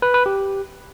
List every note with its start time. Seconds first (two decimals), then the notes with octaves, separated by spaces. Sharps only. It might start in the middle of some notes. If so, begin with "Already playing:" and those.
0.02 B4
0.14 B4
0.26 G4